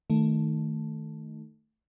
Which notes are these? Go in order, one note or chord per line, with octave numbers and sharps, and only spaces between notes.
D#3 A3